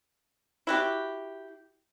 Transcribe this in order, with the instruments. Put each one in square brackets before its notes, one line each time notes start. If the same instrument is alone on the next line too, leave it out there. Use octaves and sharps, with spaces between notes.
[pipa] E4 F#4 G4